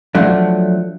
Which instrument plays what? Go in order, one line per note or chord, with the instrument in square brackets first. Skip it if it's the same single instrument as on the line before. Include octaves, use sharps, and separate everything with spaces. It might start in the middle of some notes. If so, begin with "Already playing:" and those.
[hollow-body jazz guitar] F3 F#3 A3 D4